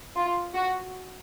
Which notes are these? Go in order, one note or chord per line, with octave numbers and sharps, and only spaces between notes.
F4
F#4